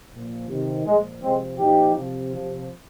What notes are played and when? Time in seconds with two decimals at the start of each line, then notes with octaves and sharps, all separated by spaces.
0.12 A#2 F3
0.48 C3 D#3
0.84 A#2 F3 G#3
1.21 C3 F3 G#3 C4
1.57 A#2 F3 D#4 G4
1.94 C3 F3
2.32 C3 F3